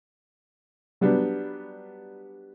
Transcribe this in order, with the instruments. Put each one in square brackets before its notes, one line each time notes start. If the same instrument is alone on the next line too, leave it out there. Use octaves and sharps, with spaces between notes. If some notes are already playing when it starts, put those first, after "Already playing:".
[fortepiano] F#3 G3 B3 D4